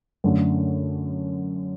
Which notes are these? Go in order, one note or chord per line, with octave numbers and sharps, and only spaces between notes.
F#2 D3 A3